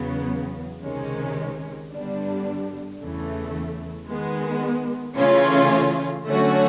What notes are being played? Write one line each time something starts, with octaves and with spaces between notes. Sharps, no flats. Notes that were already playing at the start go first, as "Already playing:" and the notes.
Already playing: E2 C#3 F#3 B3
C#2 C3 D#3 G#3 C#4
G2 D3 G3 B3 D4
E2 C#3 E3 A3
D#3 G#3 B3
C#3 E3 A3 C#4 F4
D3 F#3 A3 C#4 F#4